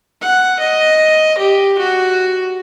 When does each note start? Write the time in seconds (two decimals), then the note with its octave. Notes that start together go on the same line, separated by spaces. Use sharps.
0.22 F#5
0.59 D#5
1.38 G4
1.78 F#4